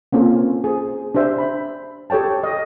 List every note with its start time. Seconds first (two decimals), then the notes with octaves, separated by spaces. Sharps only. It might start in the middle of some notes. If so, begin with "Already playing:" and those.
0.12 A#3 C4 C#4 F4 A4
0.64 G#4 C5
1.15 D4 G4 C5 E5
1.38 B5
2.10 G4 A4 C#5 G5 A5
2.43 D#5